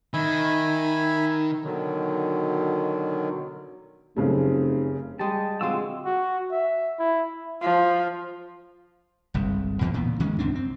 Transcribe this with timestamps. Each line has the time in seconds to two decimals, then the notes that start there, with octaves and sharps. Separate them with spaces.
0.14 D#3 E5 G#5 B5
1.64 B2 D3 D#3 F#3
4.16 F1 F#2 C#3 A3
5.19 G3 G#3 D#5 G5 A5
5.61 D3 G#3 C4 F4 F#4 F5 E6
6.05 F#4
6.51 E5
6.99 E4
7.62 F3
9.34 G1 C2 G#2
9.81 E2 B2 D#3 F3
9.94 A#2 E3 B3
10.19 D2 D#3 G#3 C#4
10.39 C2 F#2 C4 D4
10.55 C4